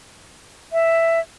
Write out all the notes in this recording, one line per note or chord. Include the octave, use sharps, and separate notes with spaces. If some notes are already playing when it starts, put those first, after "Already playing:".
E5